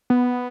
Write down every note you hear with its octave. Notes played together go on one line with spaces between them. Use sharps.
B3